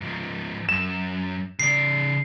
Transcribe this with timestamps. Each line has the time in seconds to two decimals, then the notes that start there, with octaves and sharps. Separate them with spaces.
0.01 G#2 F3
0.69 F#2 E7
1.60 C#3 D5 C7